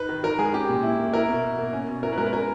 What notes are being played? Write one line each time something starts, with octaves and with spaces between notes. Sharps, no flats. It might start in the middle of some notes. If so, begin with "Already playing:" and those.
Already playing: D#4 B4
D#3
D#3 A#4
G#3 G#4
C#4 G4
A#2
E4
A#3
E4 A#4
B2
B2
A#3
C#4
B2
E4 A#4
B4
G#3 A#4
B4
C#4 A#4